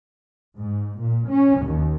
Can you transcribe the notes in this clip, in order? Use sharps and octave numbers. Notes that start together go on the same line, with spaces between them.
G#2
A#2
C#4
D#2